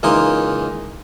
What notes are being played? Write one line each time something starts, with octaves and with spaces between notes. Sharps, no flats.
C#2 E3 A#3 D#4 D#5 C6